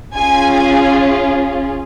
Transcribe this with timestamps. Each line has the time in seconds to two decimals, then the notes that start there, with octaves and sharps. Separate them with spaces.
0.14 C#4 F4 G#4 G#5
0.53 G#5